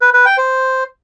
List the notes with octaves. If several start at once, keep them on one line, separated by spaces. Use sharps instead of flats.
B4
B4
G5
C5